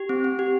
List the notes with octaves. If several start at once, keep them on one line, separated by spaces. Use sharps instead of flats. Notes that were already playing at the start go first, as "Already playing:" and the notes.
Already playing: G4
C4
C4
G4